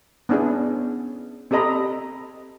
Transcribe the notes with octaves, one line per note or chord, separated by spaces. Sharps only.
B3 C#4 D4 E4 G#4
C4 G4 A4 D#5 A#5 B5